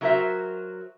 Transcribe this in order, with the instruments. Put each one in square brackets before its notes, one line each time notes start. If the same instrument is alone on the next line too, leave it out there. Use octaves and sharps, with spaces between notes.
[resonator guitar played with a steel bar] F#3 E4 F#4 A#4 C5 E5